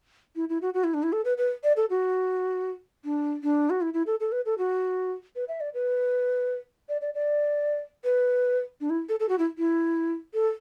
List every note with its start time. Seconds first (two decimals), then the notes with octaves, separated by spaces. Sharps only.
0.36 E4
0.49 E4
0.62 F#4
0.74 F#4
0.84 E4
0.94 D4
1.03 E4
1.13 A4
1.25 B4
1.38 B4
1.64 D5
1.77 A4
1.90 F#4
3.05 D4
3.43 D4
3.70 F#4
3.81 E4
3.94 E4
4.07 A4
4.20 A4
4.32 B4
4.46 A4
4.58 F#4
5.36 B4
5.48 E5
5.61 D5
5.74 B4
6.89 D5
7.01 D5
7.15 D5
8.04 B4
8.81 D4
8.90 E4
9.09 A4
9.20 A4
9.29 F#4
9.39 E4
9.58 E4
10.34 A4